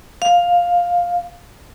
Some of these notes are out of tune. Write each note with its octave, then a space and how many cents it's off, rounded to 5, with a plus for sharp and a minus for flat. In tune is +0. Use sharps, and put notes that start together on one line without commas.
F5 +10